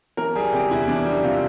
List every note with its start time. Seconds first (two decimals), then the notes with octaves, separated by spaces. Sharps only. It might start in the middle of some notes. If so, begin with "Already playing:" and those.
0.17 E3 A#4
0.35 G3 G#4
0.53 C3 G4
0.71 E2 E4
0.88 E3 D4
1.06 G3
1.24 C3 F4